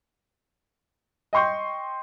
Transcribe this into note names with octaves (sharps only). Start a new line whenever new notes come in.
D#5 G5 C6 C#6 G6